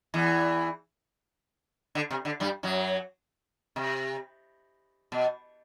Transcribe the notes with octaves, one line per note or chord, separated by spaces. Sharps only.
E2 E3
D3
C3
D3
G2 G3
F#2 F#3
C3
B2